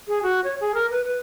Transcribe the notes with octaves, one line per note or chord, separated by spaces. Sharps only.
G#4
F#4
C#5
G#4
A#4
B4
B4